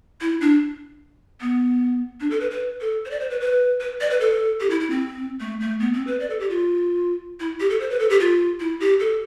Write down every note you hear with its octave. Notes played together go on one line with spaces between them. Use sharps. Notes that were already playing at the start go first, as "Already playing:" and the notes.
E4
D4
B3
D4
A4
B4
B4
A4
C5
D5
C5
B4
B4
B4
D5
B4
A4
G4
E4
E4
C4
A3
A3
B3
C4
B4
D5
A4
G4
F4
E4
G4
A4
C5
B4
A4
G4
F4
E4
G4
A4